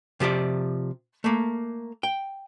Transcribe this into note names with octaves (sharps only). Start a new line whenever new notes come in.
C3 F3 G4 D5
A3 A#3
G5